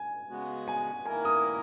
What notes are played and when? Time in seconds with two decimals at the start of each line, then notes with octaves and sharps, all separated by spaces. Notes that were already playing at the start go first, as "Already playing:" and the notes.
Already playing: G#5
0.30 C#3 G#3 B3 F#4
0.68 G#5
1.06 D#3 A#3 E4 A#4 G#5
1.25 D#6